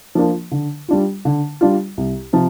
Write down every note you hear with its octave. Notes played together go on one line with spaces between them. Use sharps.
F3 A#3 D4 F4
D3
G3 D4 F4
D3
G3 D4 F4
C2
C3 F3